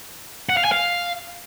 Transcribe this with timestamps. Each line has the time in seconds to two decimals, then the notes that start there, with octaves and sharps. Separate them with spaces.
0.49 F#5
0.57 F5
0.65 G#5
0.72 F5